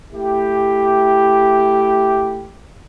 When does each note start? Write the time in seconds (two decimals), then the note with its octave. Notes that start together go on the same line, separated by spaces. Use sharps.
0.12 A3 E4 G4